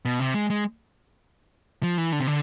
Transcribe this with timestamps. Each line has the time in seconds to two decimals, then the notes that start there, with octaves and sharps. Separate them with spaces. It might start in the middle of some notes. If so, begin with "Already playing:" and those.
0.05 B2
0.20 C3
0.34 G#3
0.50 G#3
1.83 F3
1.98 E3
2.12 D3
2.20 C3
2.27 D3